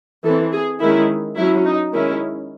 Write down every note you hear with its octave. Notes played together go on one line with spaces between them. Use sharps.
E3 C4 A4
G#4
D#3 G#3 C#4 E4
F#3 C#4 E4
D#4
D#3 G#3 C#4 E4